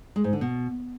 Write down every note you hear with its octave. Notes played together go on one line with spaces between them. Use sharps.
G#3
G#2
D3
B2